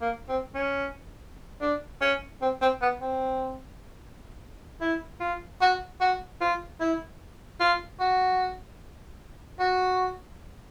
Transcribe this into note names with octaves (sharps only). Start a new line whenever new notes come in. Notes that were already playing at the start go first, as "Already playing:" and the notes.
A#3
C4
C#4
D4
C#4
C4
C4
B3
C4
E4
F4
F#4
F#4
F4
E4
F4
F#4
F#4